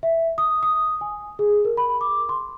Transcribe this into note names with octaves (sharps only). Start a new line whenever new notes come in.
E5
D#6
D#6
G#5
G#4
A#4
B5
D6
C6